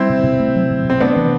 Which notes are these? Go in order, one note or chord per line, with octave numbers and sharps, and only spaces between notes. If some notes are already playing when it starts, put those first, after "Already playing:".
Already playing: G3 C4 E4
C3
C3
A3
F#3
C3
C3 C4
A3 B3 D4
E3